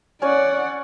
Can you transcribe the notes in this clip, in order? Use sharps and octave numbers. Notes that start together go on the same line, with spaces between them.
C#4 C#5 D5 F#5 G#5